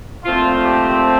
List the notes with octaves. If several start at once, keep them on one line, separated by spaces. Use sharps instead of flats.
A#2 F3 A3 C4 F4
G4